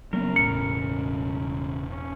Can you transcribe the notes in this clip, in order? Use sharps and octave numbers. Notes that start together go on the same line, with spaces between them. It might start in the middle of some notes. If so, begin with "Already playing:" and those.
C#3 F#3 A#3 B3 A#4
E1 A2 C#7
C#4